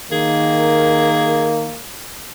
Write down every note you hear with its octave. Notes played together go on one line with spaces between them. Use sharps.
D#3 A#3 G#4